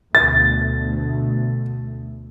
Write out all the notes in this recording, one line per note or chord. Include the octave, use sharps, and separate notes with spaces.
D2 B2 A3 A6